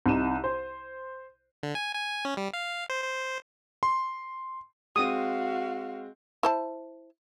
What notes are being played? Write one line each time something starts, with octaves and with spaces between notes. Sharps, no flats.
C2 C3 D#4 D#7 E7
C5
D3
G#5
G#5
C#4
G3
F5
C5
C5
C6
G#3 C4 F#4 F5 D#6
E4 C5 A5